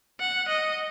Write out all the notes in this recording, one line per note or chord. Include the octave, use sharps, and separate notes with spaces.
F#5
D#5